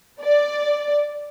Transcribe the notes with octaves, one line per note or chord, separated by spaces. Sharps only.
D5